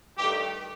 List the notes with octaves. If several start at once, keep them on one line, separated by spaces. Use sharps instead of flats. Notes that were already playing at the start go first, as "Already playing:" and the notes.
G2 D#3 A3 G4